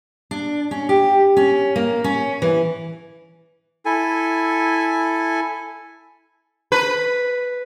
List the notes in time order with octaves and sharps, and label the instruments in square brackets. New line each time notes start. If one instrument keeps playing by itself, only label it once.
[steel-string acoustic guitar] D4
C#4
G4
C#4
A#3
C#4
E3
[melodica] E4 A4 G#5
[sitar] B4